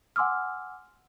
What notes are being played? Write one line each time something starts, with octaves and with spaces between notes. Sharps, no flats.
F#5 G#5 C6 D6 E6 F6